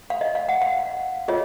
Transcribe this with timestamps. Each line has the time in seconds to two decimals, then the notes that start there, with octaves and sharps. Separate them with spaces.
0.10 F5
0.21 D#5
0.35 F5
0.49 F#5
0.62 F5
1.28 F4 G#4 C#5 D#5